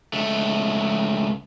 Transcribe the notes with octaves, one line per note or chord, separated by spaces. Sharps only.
C#2 A3